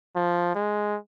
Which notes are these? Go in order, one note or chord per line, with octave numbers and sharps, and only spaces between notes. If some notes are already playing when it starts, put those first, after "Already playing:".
F3
G#3